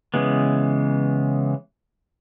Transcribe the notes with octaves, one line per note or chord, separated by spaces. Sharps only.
C#3 E3 G#3 B3